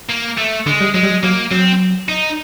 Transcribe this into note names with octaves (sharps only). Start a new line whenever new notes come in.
A#3
A3
D3 G#3
G3
F#3 G#3
G3
F#3
F#3 A#3
F#3 C4
D#4